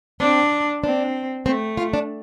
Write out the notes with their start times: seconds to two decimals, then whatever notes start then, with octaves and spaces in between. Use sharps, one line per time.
0.20 C4 D4
0.83 C4 D4
1.46 A3 C4
1.77 F4
1.93 D4